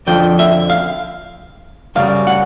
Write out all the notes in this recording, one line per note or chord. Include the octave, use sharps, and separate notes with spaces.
F2 D3 F3 G5
E5
F5
F#2 C#3 G3 F5
F#5